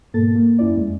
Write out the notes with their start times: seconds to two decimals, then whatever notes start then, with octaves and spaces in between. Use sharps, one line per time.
0.14 G#2 B2 A#3 A4 A6
0.35 A#3
0.59 F#2 C#4 E4 D5
0.77 F2 G#3 A3